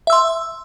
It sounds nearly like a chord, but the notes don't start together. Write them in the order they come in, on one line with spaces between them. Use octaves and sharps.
E5 E6 C6